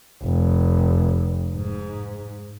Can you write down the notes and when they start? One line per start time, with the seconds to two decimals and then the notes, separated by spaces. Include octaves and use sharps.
0.23 F1
1.54 G#2